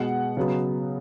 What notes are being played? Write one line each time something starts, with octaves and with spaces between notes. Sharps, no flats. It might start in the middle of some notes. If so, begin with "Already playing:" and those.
Already playing: B2 G#3 B3 F#5
C#3 F#3 B3